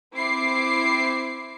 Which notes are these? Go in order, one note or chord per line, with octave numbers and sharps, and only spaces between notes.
C4 E4 D6 C7